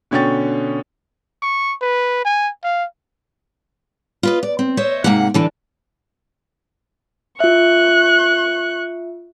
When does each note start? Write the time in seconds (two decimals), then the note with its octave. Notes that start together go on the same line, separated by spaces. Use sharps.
0.11 B2 D3 C#4 G5 C#6 A6
1.42 C#6
1.82 B4
2.25 G#5
2.64 F5
4.23 F4 B4 D#5
4.43 D5
4.59 C4
4.77 C5 C#5 D#5 E5
5.04 G#2 C3 G#3 A#3 E5 F#5
5.34 D3 E3 D4
7.40 F4 E5 C#6 F#6